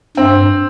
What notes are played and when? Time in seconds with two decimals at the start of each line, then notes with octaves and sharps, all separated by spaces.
0.17 G2 C4